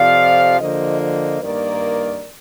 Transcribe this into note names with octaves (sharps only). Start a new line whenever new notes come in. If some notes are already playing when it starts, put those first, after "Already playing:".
Already playing: F2 C3 F3 C4 D5 F5
D3 F3 A#3 C5 D#5
C5 D#5
G2 D#3 A#3 A#4 D5